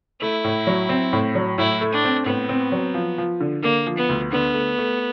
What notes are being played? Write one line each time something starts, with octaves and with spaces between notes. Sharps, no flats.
A3 E4
A2
F#3
C4
A2
F#3
A2 E4
A3
D4
C4
A2 B3
C4
F#3
F3
F3
D3
D3 A#3
F3
B3
D2
D3 B3
A3
A3